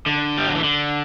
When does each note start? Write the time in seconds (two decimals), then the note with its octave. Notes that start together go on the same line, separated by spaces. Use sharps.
0.06 D3
0.38 G3
0.47 F#3
0.55 E3
0.64 D3